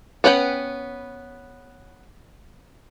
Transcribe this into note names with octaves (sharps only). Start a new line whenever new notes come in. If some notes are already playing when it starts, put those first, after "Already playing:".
B3 C#4 B4 F#5 G5